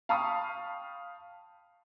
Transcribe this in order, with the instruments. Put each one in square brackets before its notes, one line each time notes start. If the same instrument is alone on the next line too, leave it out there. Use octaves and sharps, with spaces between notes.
[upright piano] F5 G5 A5 B5 C#6 D#6